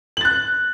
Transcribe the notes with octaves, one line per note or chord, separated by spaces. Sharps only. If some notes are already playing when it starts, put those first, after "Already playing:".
F#6 A6 F#7